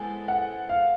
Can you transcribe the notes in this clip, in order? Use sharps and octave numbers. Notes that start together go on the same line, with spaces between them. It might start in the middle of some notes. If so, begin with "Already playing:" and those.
Already playing: G#3 B3 E4 A4 C5 G#5
F#5
F5